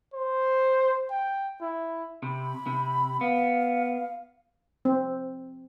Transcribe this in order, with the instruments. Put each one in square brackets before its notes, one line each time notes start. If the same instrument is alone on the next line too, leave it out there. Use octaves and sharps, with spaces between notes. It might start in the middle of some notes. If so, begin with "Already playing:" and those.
[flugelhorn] C5
G5
E4
[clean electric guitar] C3 [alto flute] B5
[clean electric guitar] C3
[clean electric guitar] B3 [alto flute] F5
[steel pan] C4